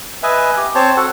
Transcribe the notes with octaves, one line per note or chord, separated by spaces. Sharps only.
B4 D#5 E5 G#5
G4
C4 C5 C#5 A5
F#4 A4 F#5